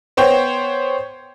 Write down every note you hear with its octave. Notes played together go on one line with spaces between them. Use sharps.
B3 C5 C#5 G5